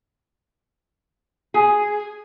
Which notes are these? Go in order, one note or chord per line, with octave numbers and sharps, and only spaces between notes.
G#4